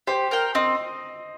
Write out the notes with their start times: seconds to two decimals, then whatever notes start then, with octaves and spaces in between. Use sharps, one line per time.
0.07 G4 C5
0.31 A#4 G5
0.55 C4 D#5